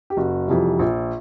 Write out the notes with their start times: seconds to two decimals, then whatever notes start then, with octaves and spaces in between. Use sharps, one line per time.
0.10 G4
0.17 F#1 F#4
0.48 F2 C3 E3 G3
0.79 A#1